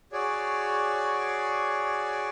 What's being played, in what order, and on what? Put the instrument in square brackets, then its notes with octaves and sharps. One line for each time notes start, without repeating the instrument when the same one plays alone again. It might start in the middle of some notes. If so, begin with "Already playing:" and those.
[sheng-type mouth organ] F#4 G#4 C#5 D5